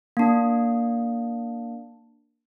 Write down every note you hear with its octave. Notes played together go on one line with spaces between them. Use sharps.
A#3 D4